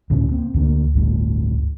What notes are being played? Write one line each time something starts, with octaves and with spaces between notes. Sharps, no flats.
D2 A2 C#3 C#4
A#3 C4
D2 D3 E3 A#3
G1 D2 A2